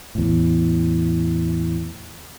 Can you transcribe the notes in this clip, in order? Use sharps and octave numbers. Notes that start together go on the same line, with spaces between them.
E2 A2